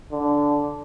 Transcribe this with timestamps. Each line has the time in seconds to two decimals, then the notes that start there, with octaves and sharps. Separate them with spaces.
0.12 D3